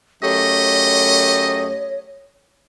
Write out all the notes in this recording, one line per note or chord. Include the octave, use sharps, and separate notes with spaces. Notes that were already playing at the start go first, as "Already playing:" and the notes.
F#2 A3 G4 C#5 D#5